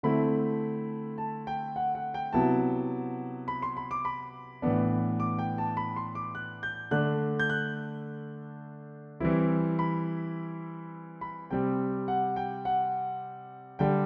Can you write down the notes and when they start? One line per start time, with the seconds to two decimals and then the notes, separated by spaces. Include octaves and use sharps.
0.03 D3 A3 C4 E4 B5
1.18 A5
1.47 G5
1.76 F#5
1.95 F#5
2.14 G5
2.33 C3 F#3 B3 E4 A5
3.48 B5
3.62 C6
3.77 B5
3.91 D6
4.05 B5
4.62 A2 E3 B3 D4
5.20 D6
5.39 G5
5.58 A5
5.77 B5
5.96 C6
6.15 D6
6.35 F#6
6.63 G6
6.91 D3 A3 D4 F#6
7.39 G6
7.50 F#6
9.20 E3 G3 C4 E4
9.79 B5
11.21 B5
11.51 C3 G3 C4 G5
12.08 F#5
12.36 G5
12.65 F#5
13.79 D3 G3 D4 G5